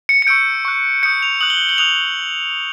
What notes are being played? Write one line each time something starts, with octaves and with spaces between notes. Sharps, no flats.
C#7
C#7
C#6 E6 G6 D7
C#6 F#6
D#6 G6 C#7
F7
D#6 F#6 F#7
G7
G7
F#7
D#6 F#6 F7